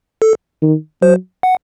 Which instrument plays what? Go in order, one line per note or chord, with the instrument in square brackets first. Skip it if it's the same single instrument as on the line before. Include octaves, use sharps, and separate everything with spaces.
[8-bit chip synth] A4
[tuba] D#3
[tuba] F#3 [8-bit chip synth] C5
[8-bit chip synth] F#5